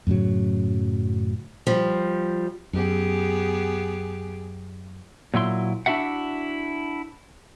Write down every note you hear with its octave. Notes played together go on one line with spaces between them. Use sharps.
F#2 A2 C#3 F#3
F3 G3
F#2 B3 G4 G#4
A#2 F#3 E4 C6
D4 E4 F#4 E5 F#5